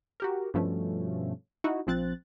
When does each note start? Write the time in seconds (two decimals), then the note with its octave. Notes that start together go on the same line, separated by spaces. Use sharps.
0.20 F#4 G4 A#4
0.54 G2 B2 F3 A3 C#4
1.64 D#4 E4 F#4
1.87 A#1 F3 C4 F#6 A6